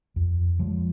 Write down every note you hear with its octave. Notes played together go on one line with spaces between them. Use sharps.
F2
F3 G#3